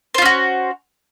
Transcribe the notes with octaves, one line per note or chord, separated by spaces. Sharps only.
C#4 F4 F#4 C5